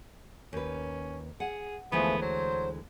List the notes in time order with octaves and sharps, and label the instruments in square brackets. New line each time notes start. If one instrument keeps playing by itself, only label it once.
[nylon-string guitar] D#2 B4 [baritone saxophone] C#4
[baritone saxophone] G#4 [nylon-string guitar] F#5
[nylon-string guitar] D2 E3 G#3 [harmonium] F3 A3 G#4 [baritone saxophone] B3
[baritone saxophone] F#3 [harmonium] C5